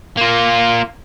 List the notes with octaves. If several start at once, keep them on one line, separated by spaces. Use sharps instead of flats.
A#3 F4